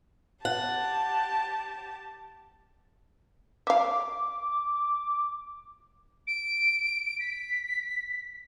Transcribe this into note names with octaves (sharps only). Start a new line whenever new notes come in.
G4 F#5 A5
E5 F5 D6
D7
B6